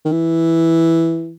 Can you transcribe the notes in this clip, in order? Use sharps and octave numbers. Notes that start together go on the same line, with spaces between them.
D#3
E3